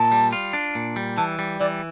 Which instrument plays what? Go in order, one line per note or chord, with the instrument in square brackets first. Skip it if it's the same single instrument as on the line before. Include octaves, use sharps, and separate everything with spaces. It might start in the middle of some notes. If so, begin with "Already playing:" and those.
Already playing: [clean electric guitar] A#2 [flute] A5
[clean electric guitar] G3
F4
D4
A#2
G3
[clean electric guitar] E3 [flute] A5
[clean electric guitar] G3
[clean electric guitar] E3 [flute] D5